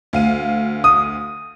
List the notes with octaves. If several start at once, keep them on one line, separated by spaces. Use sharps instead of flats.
D2 F5 D#7
D#6